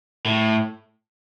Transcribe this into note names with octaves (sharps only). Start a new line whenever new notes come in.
A2